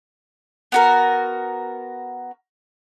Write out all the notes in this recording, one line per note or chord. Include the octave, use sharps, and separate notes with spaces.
B3 F#4 A#4